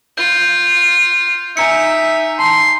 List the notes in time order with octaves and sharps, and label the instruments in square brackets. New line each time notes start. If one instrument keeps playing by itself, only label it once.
[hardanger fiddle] F4 [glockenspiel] G6
[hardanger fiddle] D#4 [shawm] E5 [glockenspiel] G#5 A#5 C#7
[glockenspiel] A5 [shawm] C6